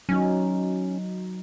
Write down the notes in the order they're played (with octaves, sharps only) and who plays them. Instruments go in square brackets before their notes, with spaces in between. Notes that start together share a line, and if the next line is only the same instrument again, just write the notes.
[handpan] F#3 D#4 [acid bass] C#4